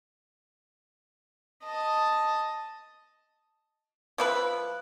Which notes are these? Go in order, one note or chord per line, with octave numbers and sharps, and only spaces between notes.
D#5 A5
F3 E4 B4